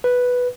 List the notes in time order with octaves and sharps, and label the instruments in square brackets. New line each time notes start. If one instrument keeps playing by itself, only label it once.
[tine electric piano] B4